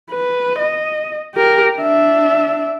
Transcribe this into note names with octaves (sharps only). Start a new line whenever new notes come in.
B4
D#5
G4 A#4
D4 E5